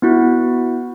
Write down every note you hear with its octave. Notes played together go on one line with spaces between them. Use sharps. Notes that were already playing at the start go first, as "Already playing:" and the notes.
B3 E4 F#4